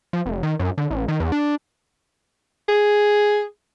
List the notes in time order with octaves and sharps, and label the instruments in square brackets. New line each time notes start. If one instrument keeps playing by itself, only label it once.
[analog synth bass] F3
F1
D#3
F#2
D3
A1
D#3
E2
D4
[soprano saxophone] G#4